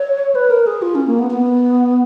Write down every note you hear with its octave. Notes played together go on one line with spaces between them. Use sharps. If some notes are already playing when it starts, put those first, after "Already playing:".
Already playing: C#5
B4
A#4
G#4
F4
C#4
A#3
B3
B3